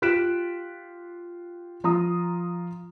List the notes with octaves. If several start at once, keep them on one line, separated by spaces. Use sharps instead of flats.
F4 G4 F#6 B6 D7 E7
F3 F4 A#5 D#6